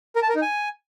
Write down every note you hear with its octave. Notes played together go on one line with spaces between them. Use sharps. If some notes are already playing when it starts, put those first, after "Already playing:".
A#4
A5
A#4
D#4
G#5